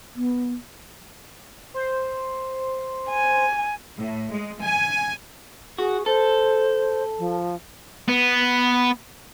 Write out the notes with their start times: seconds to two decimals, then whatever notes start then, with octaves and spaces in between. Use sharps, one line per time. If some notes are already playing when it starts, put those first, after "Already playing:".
0.15 B3
1.74 C5
3.10 G#5
3.97 A2
4.31 G#3
4.61 G#5
5.79 F#4 G#4
6.06 A4 C5
7.19 F3
8.08 B3